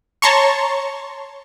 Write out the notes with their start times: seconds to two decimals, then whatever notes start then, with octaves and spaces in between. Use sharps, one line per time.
0.22 C#5 A5 A#5 C6 C#6